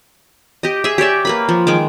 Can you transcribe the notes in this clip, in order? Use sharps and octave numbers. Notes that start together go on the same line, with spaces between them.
G4 D#5
G#4 E5
G4 C#5 D5 E5
A#3 B4 B5
F3
D#3 G#3 D6